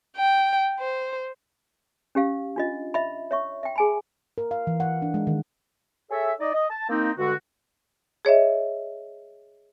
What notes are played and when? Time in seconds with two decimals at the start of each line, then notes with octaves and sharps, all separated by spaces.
0.17 G5
0.80 C5
2.15 C#4 G4 F5
2.56 D4 F4 D#5
2.94 D#5 E5 B5
3.31 C#5 E5 C#6
3.63 E5 G5
3.76 G#4 G#5 B5
4.38 A#4
4.51 F5
4.67 E3
4.80 F#5
5.02 D4
5.14 G#3
5.27 D#3
6.11 G#4 A4 C#5 E5
6.40 D#4 D5 D#5
6.54 D#5
6.70 A5
6.90 A#3 C4 D#4
7.19 G2 D3 G#3 F#4
8.25 G#4 C#5 D#5 E5